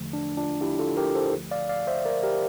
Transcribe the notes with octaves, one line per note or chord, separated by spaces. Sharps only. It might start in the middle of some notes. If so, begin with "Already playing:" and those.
Already playing: E2 D3 F3 A3
D4
D4 F4
E4 G4
F4 A4
G4 A#4
A4 C5
D2 D3 F3 A3
D5 F5
D5 F5
C5 E5
A#4 D5
G4 A#4